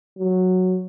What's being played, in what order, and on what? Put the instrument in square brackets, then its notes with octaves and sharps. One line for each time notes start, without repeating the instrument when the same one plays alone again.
[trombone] F#3